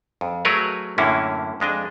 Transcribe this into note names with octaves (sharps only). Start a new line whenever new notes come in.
F2
F#3 A3 G#4 A#4 B4 C#5
F#2 A2 D3 A#3 C#4 E4
F2 G#3 D4 D#5